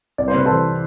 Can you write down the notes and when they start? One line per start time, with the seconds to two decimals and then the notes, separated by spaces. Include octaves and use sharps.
0.18 C2 D5
0.28 C5
0.34 C3 B4
0.45 E3 A4 C5